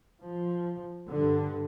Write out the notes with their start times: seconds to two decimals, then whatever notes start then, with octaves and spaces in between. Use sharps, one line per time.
0.21 F3
1.08 G2 D3